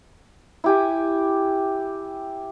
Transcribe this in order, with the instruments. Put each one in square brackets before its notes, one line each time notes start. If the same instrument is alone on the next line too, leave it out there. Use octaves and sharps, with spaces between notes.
[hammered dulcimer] E4 G4 G#5